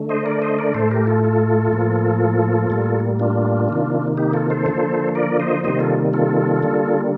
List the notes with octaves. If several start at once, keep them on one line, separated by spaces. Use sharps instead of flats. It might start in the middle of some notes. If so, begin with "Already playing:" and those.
Already playing: D3 A3
C5 D#5
A#4 D5
C5 D#5
A#4 D5
A2 A3 A4 C5
G4 A#4
F4 A4
F4 A4
A2 F3 A#3
A2 G3 A#3
D4 F4
C3 D#3 A#3
D#4 G4
F4 A4
A4 C5
D3 F3 A#3
A#4 D5
C5 D#5
C3 D#3 G3 A#3 C5 D#5
F4 A4
F4 A4
D3 G3 A#3